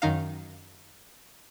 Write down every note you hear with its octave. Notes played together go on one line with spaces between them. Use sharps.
F#2 D#3 D#4 F5